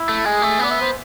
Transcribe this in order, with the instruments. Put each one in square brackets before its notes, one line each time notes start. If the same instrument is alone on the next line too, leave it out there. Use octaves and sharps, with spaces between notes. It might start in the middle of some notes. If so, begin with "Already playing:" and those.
Already playing: [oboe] E4
[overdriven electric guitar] A3
[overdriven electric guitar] G#3 [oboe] G#4
[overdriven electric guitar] A3
[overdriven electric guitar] B3 [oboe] D5
[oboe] E5
C5